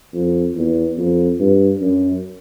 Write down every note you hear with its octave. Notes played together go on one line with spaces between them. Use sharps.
F2
E2
F2
G2
F#2